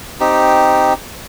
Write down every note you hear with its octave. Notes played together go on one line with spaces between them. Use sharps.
C4 D#4 G4